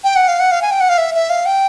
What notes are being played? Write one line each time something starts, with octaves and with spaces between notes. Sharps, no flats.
G5
F#5
F5
F#5
F5
G#5
G5
F#5
F5
E5
E5
F5
G5